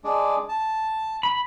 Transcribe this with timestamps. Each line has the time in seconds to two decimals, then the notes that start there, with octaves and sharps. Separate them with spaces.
0.04 G#3 D4
0.49 A5
1.23 B5